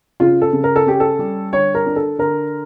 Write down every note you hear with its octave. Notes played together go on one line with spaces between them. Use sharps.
C#3 F4
A4
C#3
A#4
A4
C#4 G4
A4
G3
D3 C#5
A#4
D4
A4
D3 A#4